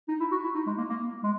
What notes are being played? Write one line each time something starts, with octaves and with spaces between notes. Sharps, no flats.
D#4
E4
F#4
E4
D#4
G#3
A#3
A#3
G#3